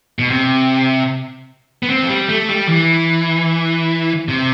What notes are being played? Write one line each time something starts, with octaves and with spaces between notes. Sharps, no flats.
B2
C3
B3
C4
F3
G3
A3
G3
E3
C3